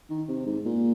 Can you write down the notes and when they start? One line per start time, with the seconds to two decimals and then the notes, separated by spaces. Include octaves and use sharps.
0.10 D#3
0.28 C3
0.46 G#2
0.66 A#2